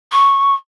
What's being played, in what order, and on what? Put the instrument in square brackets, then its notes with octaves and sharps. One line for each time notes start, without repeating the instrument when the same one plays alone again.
[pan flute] C#6